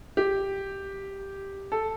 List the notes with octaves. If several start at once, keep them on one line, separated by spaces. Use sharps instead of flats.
G4
A4